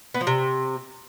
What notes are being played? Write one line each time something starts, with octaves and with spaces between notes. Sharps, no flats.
B3
F3
C3